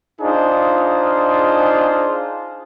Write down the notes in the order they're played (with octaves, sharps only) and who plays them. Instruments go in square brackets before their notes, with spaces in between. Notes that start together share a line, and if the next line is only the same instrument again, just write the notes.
[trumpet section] D4 D#4 F4 G#4 C5